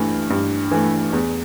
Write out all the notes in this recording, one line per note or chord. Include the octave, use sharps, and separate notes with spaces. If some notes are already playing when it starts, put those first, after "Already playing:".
Already playing: G2 E3 A3
G2
E3 A3
E2